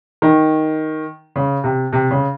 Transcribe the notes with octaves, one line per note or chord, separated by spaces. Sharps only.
D#3
C#3
C3
C3
C#3